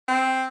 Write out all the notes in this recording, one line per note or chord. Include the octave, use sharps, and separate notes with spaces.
C4